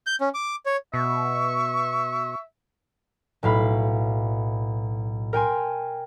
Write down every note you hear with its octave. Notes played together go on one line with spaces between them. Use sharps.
G6
C#4
D6
C#5
B2 E5 C#6
B1 A2 F5 B5
A#4 G5 G#5 C6